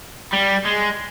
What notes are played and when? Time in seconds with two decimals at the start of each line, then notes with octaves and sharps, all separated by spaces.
0.33 G3
0.66 G#3